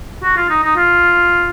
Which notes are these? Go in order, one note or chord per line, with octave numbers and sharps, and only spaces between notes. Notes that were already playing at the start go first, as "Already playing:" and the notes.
F#4
F4
D#4
D#4
F4